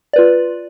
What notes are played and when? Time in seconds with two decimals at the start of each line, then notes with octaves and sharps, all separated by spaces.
0.13 D5
0.16 B4
0.18 F4